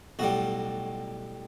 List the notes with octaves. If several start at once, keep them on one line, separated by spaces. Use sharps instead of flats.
B1 A2 G3 F#4